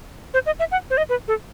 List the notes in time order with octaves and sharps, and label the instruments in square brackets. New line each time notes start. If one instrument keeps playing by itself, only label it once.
[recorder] C5
D#5
E5
F#5
C5
D#5
B4
A4